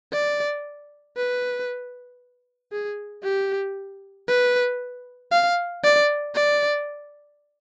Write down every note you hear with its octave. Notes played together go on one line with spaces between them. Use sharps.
D5
B4
G#4
G4
B4
F5
D5
D5